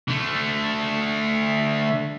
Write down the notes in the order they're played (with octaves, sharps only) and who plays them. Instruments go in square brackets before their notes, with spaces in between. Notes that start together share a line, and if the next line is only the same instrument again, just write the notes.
[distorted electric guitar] D3 A3